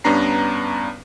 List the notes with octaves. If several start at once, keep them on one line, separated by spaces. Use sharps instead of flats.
G2 B3 C#4 D4 A#5 C7